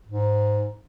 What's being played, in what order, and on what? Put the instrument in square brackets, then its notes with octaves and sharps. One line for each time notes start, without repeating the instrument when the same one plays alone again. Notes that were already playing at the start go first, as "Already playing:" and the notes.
[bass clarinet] G#2